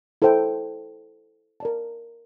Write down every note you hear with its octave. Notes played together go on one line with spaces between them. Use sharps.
E4 A4 C5 G5
A#4 D5 A5